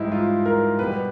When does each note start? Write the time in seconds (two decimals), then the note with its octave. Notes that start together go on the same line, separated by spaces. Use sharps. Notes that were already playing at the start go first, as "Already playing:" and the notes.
Already playing: G#2 E3 G3 D#4 E4
0.12 F4
0.46 A#4
0.79 B2 G3 B4